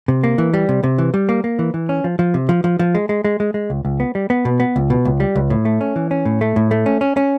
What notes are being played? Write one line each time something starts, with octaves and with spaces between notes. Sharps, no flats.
C3
A#3
E3
G3
C3
C3
E3
G3
A#3
A#3
E3
E3
C#4
F3
F3
C3
F3
F3
F3
G#3
G#3
G#3
G#3
G#3
C#2
C#2
B3
G3
B3
B2
B3
C#2
B2
C#2
G3
C#2
A2
A3
C#4
E3
C#4
A2
A3
A2
A3
C#4
C#4
C#4